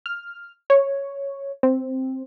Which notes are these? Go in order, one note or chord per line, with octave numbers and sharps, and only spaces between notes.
F6
C#5
C4